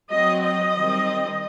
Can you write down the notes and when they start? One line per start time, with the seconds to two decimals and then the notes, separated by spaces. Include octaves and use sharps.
0.11 F#3 C4 D#5
0.43 D#5
0.76 D#3 G3 C4